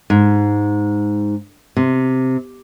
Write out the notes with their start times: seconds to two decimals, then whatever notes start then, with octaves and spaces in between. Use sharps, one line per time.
0.10 G#2
1.77 C3